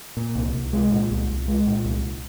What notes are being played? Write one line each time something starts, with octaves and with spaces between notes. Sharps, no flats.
A#2
C2
C2
G#3
A#2
C2
C2
G#3
A#2
C2